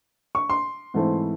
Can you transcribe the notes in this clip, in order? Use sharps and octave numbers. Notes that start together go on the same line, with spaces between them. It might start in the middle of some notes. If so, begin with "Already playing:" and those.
C#6
C6
G#2 E3 A3 C4 E4